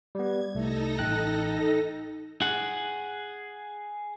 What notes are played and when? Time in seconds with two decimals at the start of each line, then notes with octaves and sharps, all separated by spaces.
0.15 G3 B3 G#6
0.55 C2 A3 D#4 A4 A#6
0.99 A1 G5 F#6
2.42 G#4 F#5